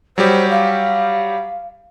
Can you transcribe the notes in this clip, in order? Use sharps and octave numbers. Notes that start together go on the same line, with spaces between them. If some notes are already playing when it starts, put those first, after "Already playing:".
F#3 G3 G4 C5
F5